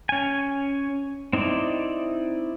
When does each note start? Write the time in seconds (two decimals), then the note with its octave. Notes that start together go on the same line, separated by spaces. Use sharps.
0.09 C#4 G#5
1.33 C4 D#4 E4 D5